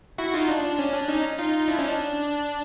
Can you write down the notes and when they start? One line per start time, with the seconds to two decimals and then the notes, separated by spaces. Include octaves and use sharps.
0.18 E4 F#4
0.34 D#4 F4
0.49 D4
0.64 D4
0.79 C#4
0.94 D4
1.08 C#4 D#4
1.38 D#4 F4
1.68 D4 E4
1.78 C#4 D#4
1.89 D4